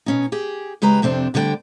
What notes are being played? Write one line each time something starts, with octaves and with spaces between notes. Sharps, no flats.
B2 C#4 D#4
G4 G#4
C#3 G#3 G4 B4 A#5
F2 C3 C4 D4
D2 D3 G3 C#5 D5 G5